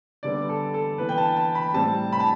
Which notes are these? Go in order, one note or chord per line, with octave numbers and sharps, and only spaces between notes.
D3 G3 B3 D5
A4
A4
E3 B3 B4
G5
A5
A5
B5
A2 G3 C4 A5
B5
A5